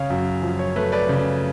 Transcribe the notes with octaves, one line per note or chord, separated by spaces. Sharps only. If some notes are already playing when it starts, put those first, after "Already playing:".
Already playing: C#3 C#5 F5
F#2
F3
C#5
A3 B4
B4 D5
C#3